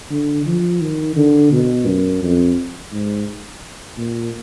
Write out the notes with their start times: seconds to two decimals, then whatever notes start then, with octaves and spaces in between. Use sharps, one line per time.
0.11 D3
0.46 F3
0.81 D#3
1.17 D3
1.52 B2
1.86 F#2
2.22 F2
2.92 G#2
3.98 A#2